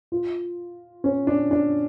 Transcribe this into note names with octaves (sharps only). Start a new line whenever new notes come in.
F4
C#4
D4
D4